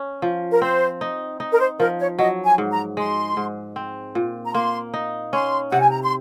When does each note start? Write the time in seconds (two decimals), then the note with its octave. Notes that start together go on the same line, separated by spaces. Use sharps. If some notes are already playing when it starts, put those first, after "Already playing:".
Already playing: C#4
0.22 F3
0.52 A#4
0.62 C4 C5
1.01 D#4
1.40 D#4
1.52 A#4
1.60 C5
1.79 F3 A#4
1.99 C#5
2.19 F#3 D#5
2.45 G#5
2.58 G#2
2.72 A#5
2.97 G#3 C6
3.37 G#2
3.76 C4
4.15 A#2
4.45 A#5
4.54 A#3 C6
4.94 D#4
5.33 C#4 C6
5.70 C3 F#5
5.80 G#5
5.90 A#5
6.02 C6